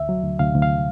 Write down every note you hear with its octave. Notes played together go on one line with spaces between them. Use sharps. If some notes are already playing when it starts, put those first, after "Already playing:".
Already playing: D2 E5
F#3
D2
D2 F5
D2
F5